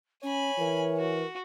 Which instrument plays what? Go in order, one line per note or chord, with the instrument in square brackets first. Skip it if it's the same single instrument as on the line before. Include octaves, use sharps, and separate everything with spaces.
[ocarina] C#4 [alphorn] C#5 [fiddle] G#5 B5
[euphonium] E3 [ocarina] A#4
[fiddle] F#4